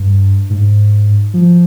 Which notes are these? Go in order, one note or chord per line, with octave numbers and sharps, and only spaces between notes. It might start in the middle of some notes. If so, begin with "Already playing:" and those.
Already playing: G2
G#2
F3